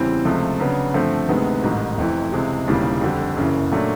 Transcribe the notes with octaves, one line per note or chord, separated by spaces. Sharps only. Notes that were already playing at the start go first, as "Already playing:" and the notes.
Already playing: E2 C#3 E3 G3 C4
C#2 C3 F3 A3
C#3 F#3 B3 D4
G2 D3 F3 A3 C4
D2 C3 D#3 G#3 B3
A1 G#2 D#3 G3
F1 F2 C3 E3
C#2 C3 E3 G#3
E1 D#2 C#3 E3 G3
F2 D3 G3
F#1 F#2 C#3 E3
A#2 F#3 A3 D4